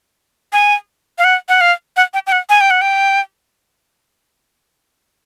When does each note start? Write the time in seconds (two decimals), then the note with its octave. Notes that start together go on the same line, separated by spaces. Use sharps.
0.53 G#5
1.18 F5
1.24 F#5
1.49 F#5
1.61 F5
1.97 F#5
2.14 G5
2.27 G5
2.32 F#5
2.49 G#5
2.61 G5
2.71 F#5
2.81 G5